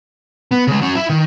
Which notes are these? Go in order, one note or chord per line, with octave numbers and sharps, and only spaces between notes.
B3
C#3 G#3
F#3 C#4
E4 E5
D#3